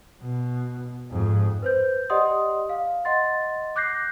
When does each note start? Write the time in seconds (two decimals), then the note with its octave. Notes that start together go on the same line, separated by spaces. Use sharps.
0.21 B2
1.11 F2 G#2
1.62 B4 C5 G6
2.10 G4 D5 D#5 F#5 C6 D#6
2.69 F5
3.05 D#5 F#5 C6 A6
3.76 D6 F#6 G6 A#6 C7